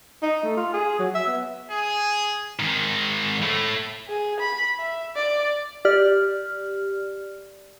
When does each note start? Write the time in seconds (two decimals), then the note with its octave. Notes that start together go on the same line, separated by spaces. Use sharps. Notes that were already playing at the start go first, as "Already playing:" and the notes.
0.22 D#4
0.43 A3
0.57 F4
0.73 G#4
0.99 F#3
1.14 E5
1.27 B3
1.71 G#4
2.60 G#2 D#3
3.43 A2 A3
4.09 G#4
4.40 B5
4.79 E5
5.16 D5
5.85 G4 D5 F6